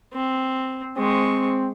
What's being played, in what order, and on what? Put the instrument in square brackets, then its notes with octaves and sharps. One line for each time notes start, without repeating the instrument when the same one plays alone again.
[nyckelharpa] C4
[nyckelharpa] G#3 C#6 [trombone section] C4